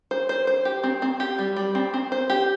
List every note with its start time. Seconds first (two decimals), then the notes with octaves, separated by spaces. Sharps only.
0.11 C5
0.29 C5
0.47 C5
0.65 G4
0.84 C4
1.02 C4
1.20 G4
1.38 G3
1.57 G3
1.75 C4
1.94 C4
2.12 C5
2.30 G4